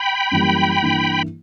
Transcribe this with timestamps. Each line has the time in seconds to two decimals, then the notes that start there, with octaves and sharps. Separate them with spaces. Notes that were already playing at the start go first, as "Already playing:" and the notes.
Already playing: G5 B5
0.31 F#2 E3 G3 A#3
0.82 G2 E3 A#3 E4